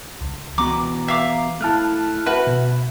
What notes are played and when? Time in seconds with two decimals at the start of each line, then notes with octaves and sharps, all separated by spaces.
0.21 C#2
0.58 E3 B3 F#4 A#5 D6
1.08 E5 F5 D6
1.61 A3 E4 A5 F6 F#6
2.26 F#4 B4 E5
2.47 B2